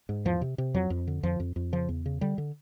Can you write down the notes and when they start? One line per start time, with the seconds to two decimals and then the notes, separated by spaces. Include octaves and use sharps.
0.09 G#2
0.25 E2 F3
0.41 C3
0.58 C3
0.74 F2 F#3
0.90 F2
1.07 D3
1.23 F2 F3
1.40 F2
1.56 F2
1.72 C#3 F3
1.89 E2
2.06 C#3
2.21 D3 G3
2.38 D3